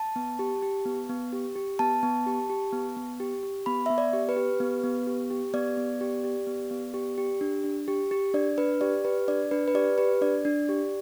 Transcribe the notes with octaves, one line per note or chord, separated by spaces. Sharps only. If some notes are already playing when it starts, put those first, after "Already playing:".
Already playing: A5
B3
G4
G4
B3
B3
G4
G4
B3 A5
B3
G4
G4
B3
B3
G4
G4
B3 B5
B3 E5
D5
G4
B4
G4
B3
B3
G4
G4
B3 D5
B3
G4
G4
B3
B3
G4
G4
D4
D4
G4
G4
D4 D5
D4 B4
G4 D5
G4 B4
D4 D5
D4 B4
B4
G4 D5
G4 B4
D4 D5
D4
G4